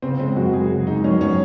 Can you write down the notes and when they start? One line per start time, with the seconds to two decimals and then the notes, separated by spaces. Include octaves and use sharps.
0.02 C#3 C4
0.20 G#3 C4
0.36 F#2 F#4
0.53 F#2 G#4
0.71 C#3
0.87 G#3 D#4
1.04 F#2 C#4
1.21 C#4